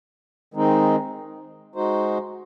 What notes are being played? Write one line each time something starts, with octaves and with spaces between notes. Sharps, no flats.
D#3 G#3 C4 D#4
G#3 D#4 F#4 C5